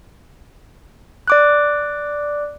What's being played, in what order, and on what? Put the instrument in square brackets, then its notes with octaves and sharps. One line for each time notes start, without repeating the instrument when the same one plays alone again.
[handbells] D5 D6 F#6